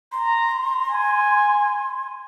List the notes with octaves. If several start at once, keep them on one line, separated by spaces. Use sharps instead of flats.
A#5 C6
G#5